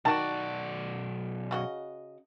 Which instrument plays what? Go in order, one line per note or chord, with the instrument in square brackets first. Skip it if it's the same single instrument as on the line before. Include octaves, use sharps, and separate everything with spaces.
[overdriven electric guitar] B1 D5 [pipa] D#3 F#4 [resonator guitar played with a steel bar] A5
[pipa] C#3 F#4 D#5